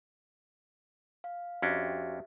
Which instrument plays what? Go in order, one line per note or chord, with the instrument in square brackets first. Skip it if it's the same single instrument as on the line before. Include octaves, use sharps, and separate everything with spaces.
[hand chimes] F5
[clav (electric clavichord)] F2 C#4 D4 [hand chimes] F#4 G4 E5